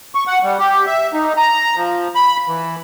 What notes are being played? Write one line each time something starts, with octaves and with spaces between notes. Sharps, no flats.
C#6
F#5
G3
G4
E5
D#4
A#5
F3
B5
E3